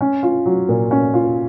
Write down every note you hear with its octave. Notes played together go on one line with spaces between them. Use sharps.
C#4
F4
F#3
A#2
C#4
F4